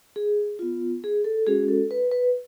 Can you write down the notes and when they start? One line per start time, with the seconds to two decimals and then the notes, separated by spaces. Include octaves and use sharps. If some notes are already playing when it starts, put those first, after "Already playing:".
0.16 G#4
0.59 B3 F4
1.04 G#4
1.24 A4
1.46 G#3 C#4 F#4 G#4
1.68 A4
1.91 B4
2.11 B4